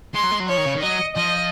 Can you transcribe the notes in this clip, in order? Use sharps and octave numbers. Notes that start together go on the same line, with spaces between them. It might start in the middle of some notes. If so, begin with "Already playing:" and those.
G#3 C6
F#3
G#3
F#3
F3 C#5
D#3
C#3
D#3
F#3 D#5
F3 D#5